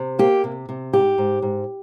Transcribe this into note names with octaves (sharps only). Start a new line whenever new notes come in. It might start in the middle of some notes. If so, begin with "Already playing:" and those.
Already playing: C3
A#3 G4
C3
C3
G#2 G4
G#2
G#2